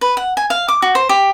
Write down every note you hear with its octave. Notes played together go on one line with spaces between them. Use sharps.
B4
F#5
G#5
F5
D6
F#4
C5
G4